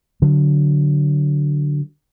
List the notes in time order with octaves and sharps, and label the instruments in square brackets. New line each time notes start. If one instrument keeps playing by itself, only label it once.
[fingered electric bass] D3 F#3